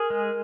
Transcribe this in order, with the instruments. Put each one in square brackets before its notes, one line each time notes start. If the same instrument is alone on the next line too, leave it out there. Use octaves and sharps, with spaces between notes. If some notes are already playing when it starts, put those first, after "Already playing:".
Already playing: [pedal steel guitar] G#4 [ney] A#4
[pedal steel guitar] G#3